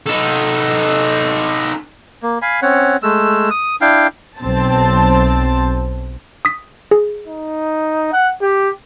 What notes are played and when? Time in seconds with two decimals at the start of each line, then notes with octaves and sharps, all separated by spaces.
0.07 D#4 A4
2.23 A#3
2.42 F5 G#5 B5
2.62 C4 C#4 C#5 F#5
3.03 G#3 A3 E6
3.51 D#6
3.81 D4 E4 F5 G5
4.40 B1 C4 A5
6.45 D#6 B6
6.91 G#4
7.27 D#4
8.13 F#5
8.41 G4